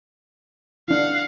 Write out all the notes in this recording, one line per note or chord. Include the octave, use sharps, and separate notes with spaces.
D4 E4 F5 F#5